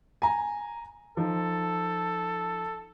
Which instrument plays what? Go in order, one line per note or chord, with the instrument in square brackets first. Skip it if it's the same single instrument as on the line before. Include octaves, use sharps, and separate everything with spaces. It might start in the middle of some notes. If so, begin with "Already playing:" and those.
[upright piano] G#5 A#5
[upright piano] F3 D#4 [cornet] A4